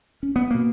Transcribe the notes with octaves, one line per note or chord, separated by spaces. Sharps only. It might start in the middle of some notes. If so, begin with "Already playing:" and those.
C#4
B3
B2 A#3